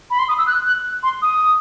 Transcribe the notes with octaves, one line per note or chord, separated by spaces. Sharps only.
B5
C6
D#6
E6
F#6
F#6
C6
D#6